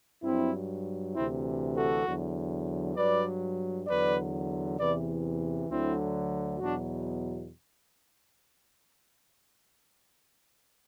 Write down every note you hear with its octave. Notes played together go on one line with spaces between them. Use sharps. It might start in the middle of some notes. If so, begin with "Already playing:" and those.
G2 F#3 C4 E4
D2 C3 E3 C4 E4
F#4 A4
E2 D3 F#3
G2 F#3 B4 D5
E2 D3 F#3 B4 D5
E2 C3 E3 B4 D5
D2 D3 F#3 C4 E4
E2 B2 F#3 D4 F#4